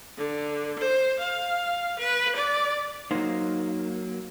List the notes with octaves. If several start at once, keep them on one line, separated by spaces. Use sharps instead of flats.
D3
C5
F5
B4
D5
F#3 A#3 D#4 C5